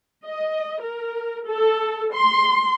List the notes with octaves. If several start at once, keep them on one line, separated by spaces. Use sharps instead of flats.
D#5
A#4
A4
C6